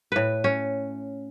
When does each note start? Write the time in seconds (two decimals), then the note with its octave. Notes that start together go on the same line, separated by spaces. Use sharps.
0.12 A2 B4
0.44 C#4